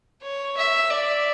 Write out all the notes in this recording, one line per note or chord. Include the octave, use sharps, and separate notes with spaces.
C#5
E5
D5